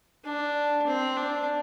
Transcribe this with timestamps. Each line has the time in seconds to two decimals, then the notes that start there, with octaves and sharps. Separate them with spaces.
0.25 D4
0.87 C4
1.17 D4